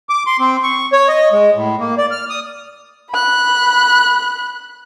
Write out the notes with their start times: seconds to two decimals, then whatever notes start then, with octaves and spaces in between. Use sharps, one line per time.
0.09 D6
0.27 C6
0.39 C4
0.63 C#6
0.93 C#5
1.08 D#5
1.32 G#3
1.55 A2
1.80 A#3
1.98 D5
2.11 F6
2.30 D#6
3.11 B5 F#6